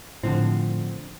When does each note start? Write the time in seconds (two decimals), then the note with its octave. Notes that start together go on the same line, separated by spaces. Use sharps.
0.24 A2 D3 F3 C4